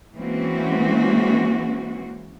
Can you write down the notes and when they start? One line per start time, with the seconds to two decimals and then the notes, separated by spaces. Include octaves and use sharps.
0.16 E3 G#3 A#3 C4 C#4 F#4